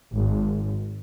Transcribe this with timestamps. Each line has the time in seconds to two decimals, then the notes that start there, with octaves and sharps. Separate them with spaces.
0.14 G#1